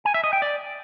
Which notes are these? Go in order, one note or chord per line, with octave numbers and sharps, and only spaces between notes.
G#5
E5
D#5
G5
D5